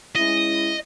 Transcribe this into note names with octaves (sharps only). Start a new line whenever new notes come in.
G#3 C#4 E4 D#5